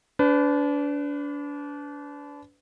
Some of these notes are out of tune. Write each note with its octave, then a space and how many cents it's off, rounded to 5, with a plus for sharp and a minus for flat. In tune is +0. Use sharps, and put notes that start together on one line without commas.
D4 -30 B4 +30